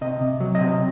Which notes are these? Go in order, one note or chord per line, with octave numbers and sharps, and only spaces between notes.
C3 D#5
C3
F#3
D#5
C3